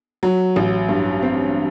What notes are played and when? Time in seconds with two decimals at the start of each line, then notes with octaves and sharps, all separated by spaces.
0.23 F#3
0.56 A1
0.89 G2
1.23 C4